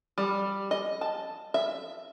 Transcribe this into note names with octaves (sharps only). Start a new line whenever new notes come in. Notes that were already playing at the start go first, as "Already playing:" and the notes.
G3
D#5
A5
E5